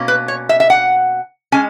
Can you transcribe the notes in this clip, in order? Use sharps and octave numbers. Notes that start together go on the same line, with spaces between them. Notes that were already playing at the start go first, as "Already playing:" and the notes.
Already playing: B2 A#3 C#4
B4
C#5
E5
E5
F#5
G#3 C#4 G#5